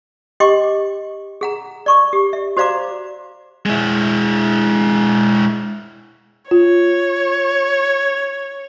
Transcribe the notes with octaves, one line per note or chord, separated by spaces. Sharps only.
G4 D#5 G5 C6 D6
G#4 F#5 A#5
D5 C#6 D6
G4
E5
F#4 C5 D5 F5 A#5 D6
G#3 E4
F4 C#5